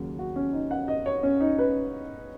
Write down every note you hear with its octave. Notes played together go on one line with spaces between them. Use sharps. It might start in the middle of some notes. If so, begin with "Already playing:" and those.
Already playing: D#2 C#3 F#3
F#4
C#4
D#4
F#5
D#5
C#5
C#4
D#4
B4